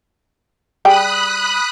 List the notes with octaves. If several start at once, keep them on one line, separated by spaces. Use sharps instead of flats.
G3 G#4 G5 B5 D#6 F#6